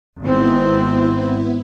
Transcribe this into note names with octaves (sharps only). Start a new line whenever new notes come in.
G#1 G#2 B3 C4 E4